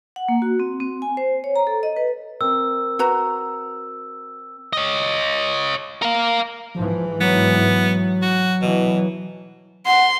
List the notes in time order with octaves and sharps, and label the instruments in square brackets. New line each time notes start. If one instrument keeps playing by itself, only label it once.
[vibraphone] F#5
A#3
F#4
C4
C4
G#5
C5
C#5
A#5
A4
D#5
B4
[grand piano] C4 A#4 [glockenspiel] E6
[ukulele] F#4 B4 A#5
[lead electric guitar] C#5 D#5
A#4 F5
[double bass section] G#2 E3 [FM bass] F3
[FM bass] F#3 [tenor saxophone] B3
[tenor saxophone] F#4
[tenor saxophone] B2 [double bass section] E3
[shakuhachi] F#5 [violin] C6